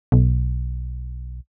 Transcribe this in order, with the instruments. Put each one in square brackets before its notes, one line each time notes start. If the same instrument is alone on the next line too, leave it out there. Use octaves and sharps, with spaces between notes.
[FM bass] B1